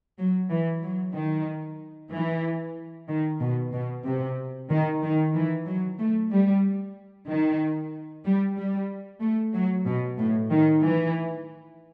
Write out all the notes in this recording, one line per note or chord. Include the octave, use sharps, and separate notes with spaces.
F#3
E3
F#3
D#3
E3
D#3
B2
B2
C3
D#3
D#3
E3
F#3
A3
G3
D#3
G3
G3
A3
F#3
B2
A2
D#3
E3